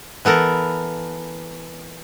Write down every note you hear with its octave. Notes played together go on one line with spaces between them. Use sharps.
E3 B3 A4 A#4